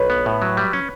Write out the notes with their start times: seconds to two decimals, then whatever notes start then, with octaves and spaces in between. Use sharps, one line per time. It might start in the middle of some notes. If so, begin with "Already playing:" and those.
Already playing: B1 B4 C#5
0.10 B3
0.26 A2
0.42 F#3
0.57 G3
0.73 C#4